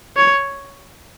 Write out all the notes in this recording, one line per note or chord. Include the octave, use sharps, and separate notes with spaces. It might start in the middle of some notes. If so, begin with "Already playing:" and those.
C#5